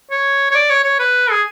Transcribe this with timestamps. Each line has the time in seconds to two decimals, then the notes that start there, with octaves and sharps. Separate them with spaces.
0.11 C#5
0.51 C#5
0.55 D5
0.70 C#5
0.84 C#5
0.99 B4
1.31 G#4